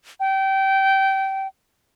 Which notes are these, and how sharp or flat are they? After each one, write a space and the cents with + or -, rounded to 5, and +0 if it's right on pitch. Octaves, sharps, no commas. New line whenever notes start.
G5 -25